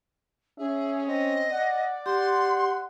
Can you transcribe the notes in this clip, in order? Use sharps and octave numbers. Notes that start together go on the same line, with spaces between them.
C#4 G#4 E5
C4 D#5
D5 F#5
G4 F#5 C6